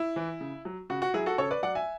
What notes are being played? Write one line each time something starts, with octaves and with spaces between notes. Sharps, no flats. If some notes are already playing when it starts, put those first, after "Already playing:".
Already playing: E4
E3
C#3
F#3
C#3 F#4
F#4
F#3 E4 G#4
F#4 A4
C#3 A4 C#5
B4 D5
F#3 D5 F#5
E5 G#5